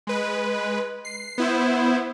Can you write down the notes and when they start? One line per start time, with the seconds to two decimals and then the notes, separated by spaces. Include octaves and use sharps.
0.07 G#3 B4
1.05 C7
1.38 B3 E4 C5